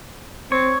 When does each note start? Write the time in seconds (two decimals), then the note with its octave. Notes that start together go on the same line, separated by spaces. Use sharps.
0.52 C4 C#5